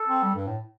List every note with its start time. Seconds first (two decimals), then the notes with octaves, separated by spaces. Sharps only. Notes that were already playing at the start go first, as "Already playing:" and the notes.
Already playing: A4
0.08 C4
0.23 G3
0.35 G2
0.47 A2